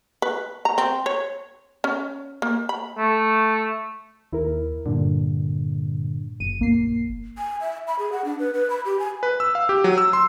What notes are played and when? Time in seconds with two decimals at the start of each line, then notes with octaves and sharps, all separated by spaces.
0.22 B4
0.65 A#5
0.78 C4
1.06 C#5
1.84 C#4
2.42 A#3
2.69 B5
2.98 A3
4.33 D#2 E4 A#4
4.86 G2 A#2 D3
6.40 F#1 D#7
6.59 A#1 A#3 C7
7.38 G#5
7.61 E5
7.88 B5
7.99 G#4
8.12 F#5
8.25 D4
8.39 B4
8.54 B4
8.70 B5
8.85 G4
8.99 G#5
9.23 B4
9.40 E6
9.55 F5
9.69 G4
9.84 F#3
9.98 E6
10.13 C6